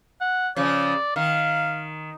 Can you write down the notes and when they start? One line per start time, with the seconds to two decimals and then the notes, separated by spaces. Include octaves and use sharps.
0.21 F#5
0.56 C#3 F3 D5
1.16 D#3 F5